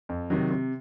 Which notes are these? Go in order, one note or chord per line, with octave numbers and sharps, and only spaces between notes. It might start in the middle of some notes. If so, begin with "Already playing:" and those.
F2
C3 D#3 F#3
C3